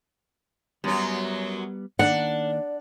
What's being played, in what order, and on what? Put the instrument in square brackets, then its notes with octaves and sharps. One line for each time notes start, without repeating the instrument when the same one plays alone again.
[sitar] F#2 F#3 [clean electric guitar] G3 B3
[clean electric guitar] D#3 A#3 [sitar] D4 [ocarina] D5 [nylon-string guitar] F#5